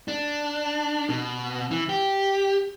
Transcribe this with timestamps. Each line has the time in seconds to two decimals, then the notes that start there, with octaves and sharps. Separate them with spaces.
0.08 D4
1.09 B2
1.71 E3
1.89 G4